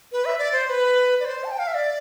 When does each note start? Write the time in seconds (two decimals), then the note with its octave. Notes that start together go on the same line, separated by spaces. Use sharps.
0.12 B4
0.25 E5
0.39 D5
0.52 C5
0.66 C5
0.69 B4
1.20 D5
1.25 C5
1.44 A5
1.51 G5
1.59 F5
1.67 E5
1.75 D5